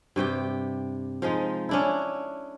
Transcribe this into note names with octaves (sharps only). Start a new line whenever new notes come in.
G2 C3 G4 G5
F3 G#3 D#4
C#4 D4 E4